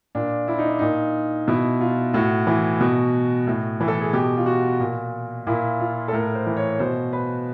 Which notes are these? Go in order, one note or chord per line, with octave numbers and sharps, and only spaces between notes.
A#2 D4
E4
D#4
D4
A#2 D#4
B2 E4
F4
A2 F#4
E3
B2
A2
E3
A4
G#4
B2 G4
F4
F#4
A#2
A#2 E4
F4
A4
A2 A#4
C5
E3
C#5
B2 C5
B4